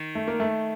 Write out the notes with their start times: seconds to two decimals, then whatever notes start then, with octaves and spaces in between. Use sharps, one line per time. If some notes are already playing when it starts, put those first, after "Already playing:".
Already playing: D#3
0.15 A3
0.28 A#3
0.40 A3